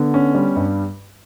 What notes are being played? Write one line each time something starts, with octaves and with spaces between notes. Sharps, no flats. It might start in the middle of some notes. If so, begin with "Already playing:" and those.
Already playing: D3 B3
C#4
G3
G2